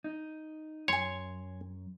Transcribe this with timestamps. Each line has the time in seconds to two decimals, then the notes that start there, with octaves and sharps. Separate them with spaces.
0.04 D#4
0.88 F#2 C#5 G#5 C6